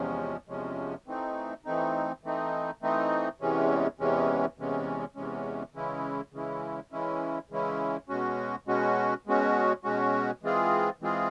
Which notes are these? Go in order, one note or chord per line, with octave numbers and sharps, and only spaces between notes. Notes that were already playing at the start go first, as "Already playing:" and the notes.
Already playing: E2 C3 F3 G#3 C#4
E2 C3 F3 G#3 C#4
E3 A3 C4 D#4
E3 A3 C4 D#4
E3 A3 C4 D#4
E3 A3 C4 D#4
E2 C3 E3 G#3 C#4
E2 C3 E3 G#3 C#4
E2 C3 E3 G#3 C#4
E2 C3 E3 G#3 C#4
C#3 E3 G#3 C#4 E4
C#3 E3 G#3 C#4 E4
C#3 E3 G#3 C#4 E4
C#3 E3 G#3 C#4 E4
B2 G#3 C#4 F#4
B2 G#3 C#4 F#4
B2 G#3 C#4 F#4
B2 G#3 C#4 F#4
E3 G#3 C4 F4 G#4
E3 G#3 C4 F4 G#4